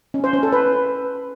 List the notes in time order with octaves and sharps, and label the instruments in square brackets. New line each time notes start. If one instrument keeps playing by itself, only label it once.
[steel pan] C#4
C5
C#4
A4
B4